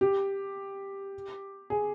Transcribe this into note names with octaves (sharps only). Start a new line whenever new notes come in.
G4
G#4